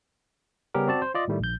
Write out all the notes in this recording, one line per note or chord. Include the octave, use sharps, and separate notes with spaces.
C#3 G3 B3 C#4 G4 A#4
C4 F#4 D5 A5
C5
F4 D5 D#5
A2 D#3 G3 A3
A#1 G6